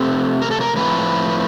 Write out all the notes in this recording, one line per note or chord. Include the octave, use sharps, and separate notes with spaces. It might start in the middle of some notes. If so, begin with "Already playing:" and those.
Already playing: C3 F3 A3 C4
A#4
A4
A#4
A2 F3 A3 C4 B4